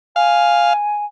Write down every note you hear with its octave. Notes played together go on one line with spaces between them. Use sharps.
F5 G#5